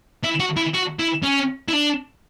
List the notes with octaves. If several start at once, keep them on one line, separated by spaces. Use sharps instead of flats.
E4
F#4
E4
F#4
E4
C#4
E4
D4